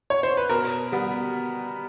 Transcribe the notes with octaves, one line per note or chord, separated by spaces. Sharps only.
C#5
C5
B4
B2 A#4
G3 B3